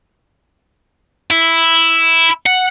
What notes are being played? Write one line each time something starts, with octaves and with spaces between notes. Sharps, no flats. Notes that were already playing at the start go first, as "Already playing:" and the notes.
E4
F#5